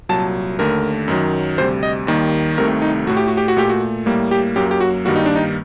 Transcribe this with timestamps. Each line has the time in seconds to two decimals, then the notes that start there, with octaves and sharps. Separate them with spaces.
0.09 C2 A#2 F#3 A5
0.59 D#2 D3 A3 A#4
1.08 F#2 D#3 F#3
1.58 D2 C3 G3 C5
1.83 D#5
2.07 D#2 D#3 G3 A#3
2.58 C2 C3 D#3 A3 A#4
2.82 D#4
3.07 A2 A3 F#4
3.17 G4
3.27 F#4
3.37 G4
3.48 F#4
3.57 A#2 A3 G4
3.69 F#4
4.06 A2 G3 A#3
4.31 G4
4.56 F#2 F#3 A#3 G4
4.71 G4
4.80 F#4
5.05 G2 D#3 G3 A#3 F#4
5.16 D#4
5.26 D4
5.36 D#4